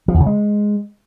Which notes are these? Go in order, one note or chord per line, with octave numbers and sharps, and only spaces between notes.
F3
E2
C#3
G#3